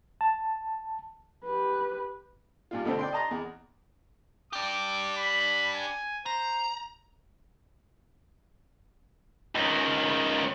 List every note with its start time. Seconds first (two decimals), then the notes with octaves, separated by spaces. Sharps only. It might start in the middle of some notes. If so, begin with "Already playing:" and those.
0.21 A5
1.44 G4 B4
2.71 G2 A#2 F4
2.85 F2 B2 D3 A3 C4
2.99 D5 G5 C6
3.13 D#5 A5 A#5 C6 D#6
3.31 E2
4.53 D4 G4 D6
5.17 B5
5.75 G#5
6.26 C5 A#5
9.55 C#2 D#3